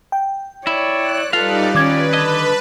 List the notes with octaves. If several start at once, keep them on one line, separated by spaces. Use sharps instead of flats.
G5
E4 C#5 D5
F#6
G3 D#4 F4 A4 B4 D5 F5
D#3 C#4 B4 D5 D6 G#6
D3 D#5 A5